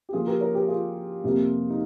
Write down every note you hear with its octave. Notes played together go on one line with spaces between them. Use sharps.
G4
C#3 F3 A#3 F4 G#4
G4 A#4
A#4 C#5
G4 A#4
F4 G#4
F2 C3 G3 A#3
D#4